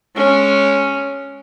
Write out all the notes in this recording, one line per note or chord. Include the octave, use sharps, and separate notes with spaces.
G#3 C#4